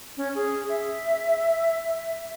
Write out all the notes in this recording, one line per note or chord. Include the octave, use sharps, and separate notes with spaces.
C#4
G#4
E5